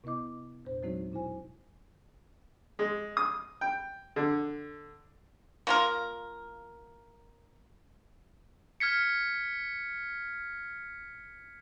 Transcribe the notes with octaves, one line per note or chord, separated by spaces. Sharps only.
C3 B3 E4 D#5 D6
E2 A#2 C5
F#3 G#3 C4 D#4 F#4 C#5
B2 E4 C5 G#5
G#3
D#6
G5
D3
A#3 F4 A#4
F6 G#6 B6 C#7